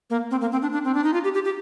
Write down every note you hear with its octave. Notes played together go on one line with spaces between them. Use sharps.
A#3
C4
A#3
C4
D4
D4
C4
D4
D#4
F4
G4
G4
G4